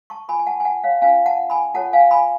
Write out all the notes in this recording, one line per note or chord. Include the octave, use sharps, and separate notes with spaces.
A5 C#6
F4 B4 G#5 B5
G#5
F#5 A5
G#5
F#5 A5
C#5 F5
C#4 F4 B4 F5 G#5
F#5 A5
G#5 B5
F4 A4 C#5 F#5 A5
F5 G#5
G#5 B5